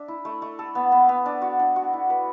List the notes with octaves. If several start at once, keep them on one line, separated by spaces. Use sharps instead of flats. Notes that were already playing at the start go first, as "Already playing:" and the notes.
Already playing: D4 E5
E4
A3
A3
A4
B3
B3
B3
D4
F#4
D4
F#4
E4
B4